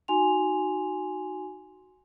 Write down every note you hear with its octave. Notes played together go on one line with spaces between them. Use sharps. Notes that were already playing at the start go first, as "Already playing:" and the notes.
D#4 F#4 G#5 C6 F7